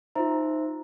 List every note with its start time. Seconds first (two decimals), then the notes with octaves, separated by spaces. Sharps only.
0.15 D#4 F4 C5 E5 A#5